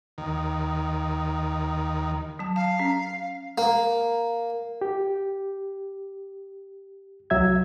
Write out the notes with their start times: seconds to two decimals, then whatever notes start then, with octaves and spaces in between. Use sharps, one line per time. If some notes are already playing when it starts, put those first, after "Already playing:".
0.18 D#2 D#3
2.39 F#3 A5
2.56 F5 A5
2.79 C#4
3.58 A#3
4.81 G4
7.30 C2 F#3 E5 G#6